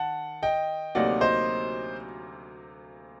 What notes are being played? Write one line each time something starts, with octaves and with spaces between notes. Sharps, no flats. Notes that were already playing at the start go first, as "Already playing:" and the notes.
Already playing: D#3 F#5 A5
D#5 G5
D2 C3 F#3 A#3 D#4 D5 F#5
C5 D#5